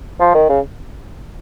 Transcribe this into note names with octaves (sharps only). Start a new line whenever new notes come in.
F3
D#3
C#3